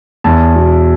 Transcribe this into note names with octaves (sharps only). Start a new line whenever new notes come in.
E2 A5
B2